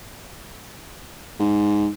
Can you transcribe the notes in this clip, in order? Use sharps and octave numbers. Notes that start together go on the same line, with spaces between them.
G#2